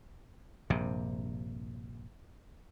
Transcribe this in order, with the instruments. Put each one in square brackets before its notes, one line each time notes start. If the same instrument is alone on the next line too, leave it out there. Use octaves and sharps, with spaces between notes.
[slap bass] A#1 G2 C3